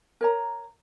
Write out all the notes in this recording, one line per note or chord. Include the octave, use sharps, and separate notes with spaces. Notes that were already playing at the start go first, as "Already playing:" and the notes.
A#4 C#5 A#5